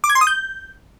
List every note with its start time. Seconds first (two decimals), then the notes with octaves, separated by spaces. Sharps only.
0.04 D6
0.10 G#6
0.15 C6
0.21 D#6
0.27 G6